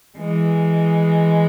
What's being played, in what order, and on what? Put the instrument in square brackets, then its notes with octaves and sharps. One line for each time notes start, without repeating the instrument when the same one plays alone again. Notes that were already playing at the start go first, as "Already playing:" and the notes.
[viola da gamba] E3 G#3